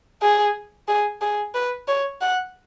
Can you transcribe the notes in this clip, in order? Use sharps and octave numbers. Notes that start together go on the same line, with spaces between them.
G#4
G#4
G#4
B4
C#5
F#5